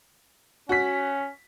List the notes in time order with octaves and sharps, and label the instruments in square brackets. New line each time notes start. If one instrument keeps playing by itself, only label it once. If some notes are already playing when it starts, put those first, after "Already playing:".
[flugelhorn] C#4 [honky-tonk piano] F#4 B6